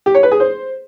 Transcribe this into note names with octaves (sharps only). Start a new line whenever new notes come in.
G4
C#5
B4
G#4
C5